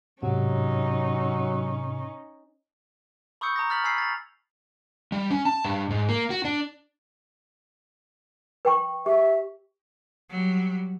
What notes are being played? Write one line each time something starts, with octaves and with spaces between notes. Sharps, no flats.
G#2 C3 F#3 C#4 D#4
B5 C#6 D#6 E6 G6 C#7
A#5 D#6 A#6
F6 A6 B6 F#7
G#5 B5 E6 G#6 B6 C7
A6 F7
G3
C#4
A5
G2
G#2
A#3
F#4
D4
B4 G5 C#6
G4 E5
F#3 G3